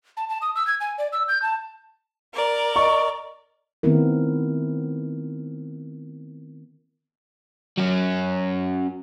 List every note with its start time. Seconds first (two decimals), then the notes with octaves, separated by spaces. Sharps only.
0.17 A5
0.29 A5
0.42 D#6
0.56 E6
0.67 G#6
0.80 G#5
0.98 D5
1.13 E6
1.28 G6
1.42 A5
2.32 A#4 D5
2.76 D#5 C#6
3.83 D#3 A3 B3 C4 E4 A#4
7.77 F#3 C#4